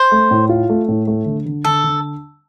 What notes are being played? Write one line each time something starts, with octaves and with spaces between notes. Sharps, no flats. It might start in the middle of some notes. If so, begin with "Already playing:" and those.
Already playing: C5
A3
A2
F4
A3
A2
A3
D3
D3
D3 A4
D3